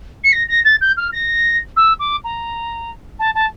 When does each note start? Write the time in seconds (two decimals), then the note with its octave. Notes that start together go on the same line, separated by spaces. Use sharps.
0.23 C#7
0.32 A#6
0.48 A#6
0.64 A6
0.81 G6
0.96 F6
1.12 A#6
1.76 E6
1.99 D6
2.24 A#5
3.19 A5
3.34 A5